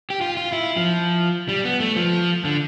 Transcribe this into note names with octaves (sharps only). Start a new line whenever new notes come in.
G4
F4
F4
E4
F3
G3
B3
A3
F3
D3